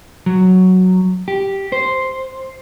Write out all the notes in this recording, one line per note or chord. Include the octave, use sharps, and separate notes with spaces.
F#3
G4
C5